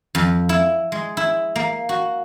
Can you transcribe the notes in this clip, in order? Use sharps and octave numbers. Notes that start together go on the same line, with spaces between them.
F2
E4
G#3
E4
A#3
F#4